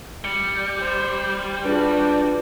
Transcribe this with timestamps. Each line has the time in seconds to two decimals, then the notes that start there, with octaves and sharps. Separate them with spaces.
0.24 G3 C#7
0.79 C5
1.65 D4 F4 F#4 G#4 B4